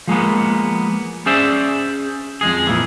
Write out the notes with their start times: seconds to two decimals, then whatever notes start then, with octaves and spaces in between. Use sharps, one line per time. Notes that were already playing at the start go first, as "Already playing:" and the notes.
0.08 F3 G#3 A#3 B3
1.26 C#4 G#4 C5 D5 E5
2.41 F2 G#3 G#4
2.67 F2 A#2 E3